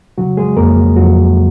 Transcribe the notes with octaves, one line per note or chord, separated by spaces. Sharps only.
C#3 F#3 F#4
G#3 G#4
F2 A#3 A#4
F2 F#3 F#4